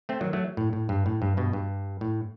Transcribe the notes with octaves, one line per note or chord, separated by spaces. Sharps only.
A3 C4
D#3 F#3
F#3 A3
A2
A2
G2
A2
G2
G2 B2
G2
A2